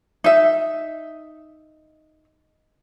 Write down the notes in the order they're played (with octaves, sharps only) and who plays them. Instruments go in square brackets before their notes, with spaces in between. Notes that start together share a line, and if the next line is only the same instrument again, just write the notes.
[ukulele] D#4 E5